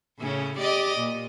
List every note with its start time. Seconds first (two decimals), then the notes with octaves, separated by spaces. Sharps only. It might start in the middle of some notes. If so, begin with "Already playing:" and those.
0.19 A2 C#3 C#4
0.58 G4 D5 D#5
0.97 A#2